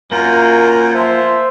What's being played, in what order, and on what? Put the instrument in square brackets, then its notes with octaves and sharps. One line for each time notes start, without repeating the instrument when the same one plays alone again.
[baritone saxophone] F#2 [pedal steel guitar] A#3 F4 [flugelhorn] A#4
[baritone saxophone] F3 [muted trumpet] C5 [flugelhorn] E5